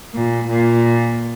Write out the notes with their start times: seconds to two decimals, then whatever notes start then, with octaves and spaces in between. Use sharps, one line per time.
0.14 A#2
0.48 A#2